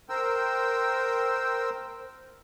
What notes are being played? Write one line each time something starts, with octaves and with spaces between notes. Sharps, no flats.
A#4 C5 G5 E6